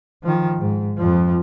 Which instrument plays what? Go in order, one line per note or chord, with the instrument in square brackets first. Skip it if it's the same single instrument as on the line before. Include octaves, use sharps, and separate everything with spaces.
[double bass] D#3 F3
G#2
F2 F3